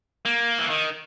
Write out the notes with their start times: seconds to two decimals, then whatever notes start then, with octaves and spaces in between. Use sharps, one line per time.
0.25 A#3
0.59 E3
0.70 D#3